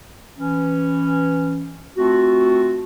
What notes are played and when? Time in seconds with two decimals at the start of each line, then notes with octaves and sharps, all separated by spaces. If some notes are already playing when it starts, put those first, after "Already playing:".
0.38 E3 C#4
1.97 A3 C4 F4 F#4